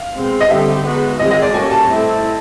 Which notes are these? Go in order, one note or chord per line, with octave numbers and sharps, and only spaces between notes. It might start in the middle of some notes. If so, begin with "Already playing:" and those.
Already playing: F5
B2 G#3 C4
D#5
D3 G3 C4 D#4 G4 E5
G#3 B3 D#4 F#4
D#3 G#3 C4 F4 G#4 D#5
D#5
D5
G3 A#3 C#4 F#4 A4 G#5
A5
A3 C4 E4